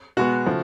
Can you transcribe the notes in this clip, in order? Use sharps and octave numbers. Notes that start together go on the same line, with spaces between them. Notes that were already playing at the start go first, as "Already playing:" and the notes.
B2 G#3 B3 F#4
C#3 F3 A3